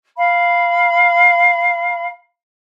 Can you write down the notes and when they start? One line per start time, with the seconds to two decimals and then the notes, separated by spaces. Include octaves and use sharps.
0.16 F5 B5